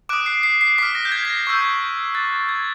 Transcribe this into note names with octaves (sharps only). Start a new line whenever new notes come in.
D6 D#6 F#6 D7
C7
C7
C7
D6 F6 B6
A#6
G6
G#6
B6
A#6
C#6 E6 G6
D6 F#6 A6
G#6
G#6